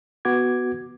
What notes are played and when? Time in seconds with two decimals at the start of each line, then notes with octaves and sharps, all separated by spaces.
0.25 B3 F#4 D6 G#6